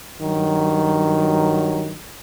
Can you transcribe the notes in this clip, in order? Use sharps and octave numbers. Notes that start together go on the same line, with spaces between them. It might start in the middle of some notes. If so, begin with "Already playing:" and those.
G2 D#3 F#3